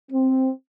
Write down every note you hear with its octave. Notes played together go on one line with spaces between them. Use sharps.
C4